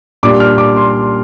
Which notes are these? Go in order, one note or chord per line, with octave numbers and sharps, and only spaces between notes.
A#2 G3 D4 D6
F6
D6
C6